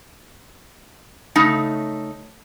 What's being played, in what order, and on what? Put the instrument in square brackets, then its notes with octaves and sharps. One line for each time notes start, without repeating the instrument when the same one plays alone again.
[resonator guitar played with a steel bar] C#3 A3 D#4